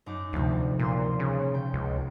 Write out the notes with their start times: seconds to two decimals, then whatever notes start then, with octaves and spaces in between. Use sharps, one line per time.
0.06 F#2 D#4 D6
0.33 D2 C3 F3
0.80 A#2 G3 C6
1.20 C#3
1.54 G5
1.74 C#2